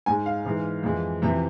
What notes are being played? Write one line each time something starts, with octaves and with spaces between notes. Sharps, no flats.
G#2 G#3 G#5
F5
G#2 E3 G#3
F2 E3 G#3
F2 C3 E3 E5